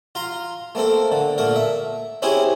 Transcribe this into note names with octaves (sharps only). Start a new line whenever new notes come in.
F4 A#5 C6
A3 A#3 C4 A4
D3
A#2 A3 A#3 A#4
E5
C4 C#4 E4 G4 G#4